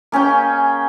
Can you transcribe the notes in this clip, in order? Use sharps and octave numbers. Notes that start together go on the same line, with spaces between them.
A#3 C#4 G#4 G5